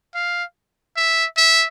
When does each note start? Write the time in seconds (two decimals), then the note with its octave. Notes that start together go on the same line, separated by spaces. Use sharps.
0.15 F5
0.96 E5
1.37 E5